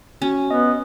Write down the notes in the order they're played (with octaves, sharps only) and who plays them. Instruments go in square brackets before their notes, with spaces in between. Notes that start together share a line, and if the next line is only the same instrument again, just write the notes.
[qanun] C#4 [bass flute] F#4
[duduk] B3 [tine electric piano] D#5